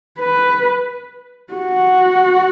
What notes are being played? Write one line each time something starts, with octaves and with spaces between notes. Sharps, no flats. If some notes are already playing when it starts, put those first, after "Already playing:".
B4
F#4